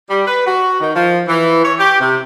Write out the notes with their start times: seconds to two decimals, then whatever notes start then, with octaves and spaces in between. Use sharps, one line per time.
0.10 G3
0.27 B4
0.47 F#4
0.80 D#3
0.96 F3
1.28 E3
1.65 C#5
1.79 G4
2.00 C3